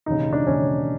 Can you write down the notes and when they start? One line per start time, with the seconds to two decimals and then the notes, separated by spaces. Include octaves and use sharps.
0.06 E1 D#2 C#3 D#4
0.33 D4
0.46 E1 D#2 C#3 C#4